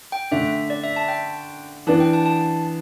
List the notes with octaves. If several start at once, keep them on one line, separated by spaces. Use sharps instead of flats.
G5
D3 A3 D4 E5
D5
E5
A5
G5
E3 B3 D4 A5
G5
A5
A5